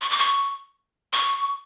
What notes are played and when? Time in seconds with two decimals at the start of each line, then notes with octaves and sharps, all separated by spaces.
0.01 C#6
0.10 D6
0.19 C#6
1.13 C#6